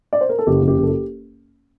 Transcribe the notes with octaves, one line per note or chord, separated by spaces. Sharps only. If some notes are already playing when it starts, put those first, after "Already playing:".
D5
C5
A#4
A4
F#1 G4
F#1
G4
F#1
A4
G4